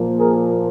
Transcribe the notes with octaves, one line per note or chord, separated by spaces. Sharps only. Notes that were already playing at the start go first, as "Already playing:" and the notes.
Already playing: A#2 F3 A#3
G#4 A#4